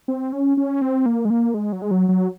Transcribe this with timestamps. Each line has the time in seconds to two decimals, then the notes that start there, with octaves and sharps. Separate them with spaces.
0.08 C4
0.32 C#4
0.57 C#4
0.82 C4
1.06 A#3
1.25 G#3
1.30 A#3
1.54 G#3
1.72 F#3
1.82 G#3
1.91 F#3
2.09 F#3